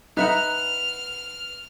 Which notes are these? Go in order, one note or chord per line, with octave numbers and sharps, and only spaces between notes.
D#4 B4 E5 F#5 F6